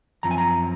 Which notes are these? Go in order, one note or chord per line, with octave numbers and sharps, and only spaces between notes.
F#2 F3 C4 A#5
G#5
A#5